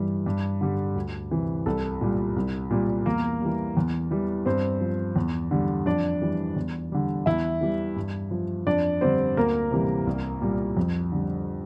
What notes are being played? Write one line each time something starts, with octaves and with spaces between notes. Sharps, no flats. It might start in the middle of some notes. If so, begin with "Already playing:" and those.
Already playing: G2 E3 G3
G2
D3 G3
D2
C3 E3
C2 A4
A#2 G3
C2
A#2 G3
E2 A#3 A#4
E3 G3
E2
E3 G3
G2 C4 C5
F3
E2
D3 G3
F2 D4 D5
E3 G3
E2
D3 G3
E2 E4 E5
E3 G3
G2
F3
F2 D4 D5
D3 G3 C4 C5
D2 A#3 A#4
C3 E3 G3
C2
A#2 G3
F2
D3 G3